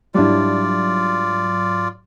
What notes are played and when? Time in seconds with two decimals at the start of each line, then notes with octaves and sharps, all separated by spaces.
0.14 G#2 F#3 G3 D4 E4 F4 D5